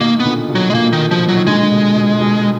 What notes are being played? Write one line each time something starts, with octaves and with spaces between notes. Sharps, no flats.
B2 D#3 A#3
B3
A#2 D3
B2
F#3
G#3
A#2 A#3
D#3
B2 F3
F3 F#3
D#3
A#2 D3 G#3
D3
B2
B2
B2